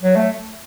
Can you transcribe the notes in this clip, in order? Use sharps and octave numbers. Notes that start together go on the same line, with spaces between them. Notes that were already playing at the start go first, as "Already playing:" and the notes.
F#3
A3